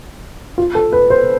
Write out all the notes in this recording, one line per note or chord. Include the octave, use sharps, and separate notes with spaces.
F4
A4
B4
C5